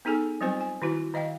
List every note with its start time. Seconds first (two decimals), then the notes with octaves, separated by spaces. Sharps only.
0.05 B3 D#4 G#4 A4 G#5
0.41 F#3 G3 C4 F4 C5 G#5
0.61 G#5
0.82 D#3 E4 F#4 B4
1.14 D#3 D#5 F5 G5